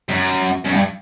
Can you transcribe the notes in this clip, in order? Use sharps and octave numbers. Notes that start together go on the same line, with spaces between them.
F#2
F#2
G2